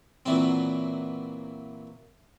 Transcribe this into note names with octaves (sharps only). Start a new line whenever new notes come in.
A#2 E3 F#3 C4